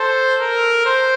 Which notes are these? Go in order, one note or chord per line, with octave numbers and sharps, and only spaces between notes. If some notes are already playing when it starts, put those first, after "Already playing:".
Already playing: A4 C5
A#4
C5